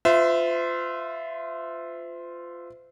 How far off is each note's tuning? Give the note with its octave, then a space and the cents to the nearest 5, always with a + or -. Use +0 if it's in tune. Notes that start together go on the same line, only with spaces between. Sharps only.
F4 +0 C5 -40 E5 +0